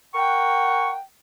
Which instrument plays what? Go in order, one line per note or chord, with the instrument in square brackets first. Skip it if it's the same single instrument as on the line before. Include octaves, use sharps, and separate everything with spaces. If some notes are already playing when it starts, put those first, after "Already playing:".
[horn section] A#4 F#5 [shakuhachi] G5 [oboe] C#6